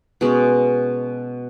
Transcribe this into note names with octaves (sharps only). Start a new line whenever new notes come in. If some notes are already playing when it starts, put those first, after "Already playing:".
B2 G#3 C#4